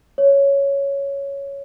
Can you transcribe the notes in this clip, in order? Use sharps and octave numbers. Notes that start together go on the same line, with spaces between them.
C#5